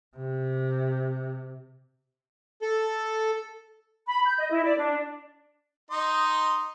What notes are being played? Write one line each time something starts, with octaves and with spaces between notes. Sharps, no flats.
C3
A4
B5
G6
D#5
E4
D5
D4
D#4 D#5 C6